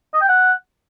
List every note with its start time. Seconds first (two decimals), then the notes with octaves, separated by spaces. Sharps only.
0.14 D#5
0.21 G5
0.29 F#5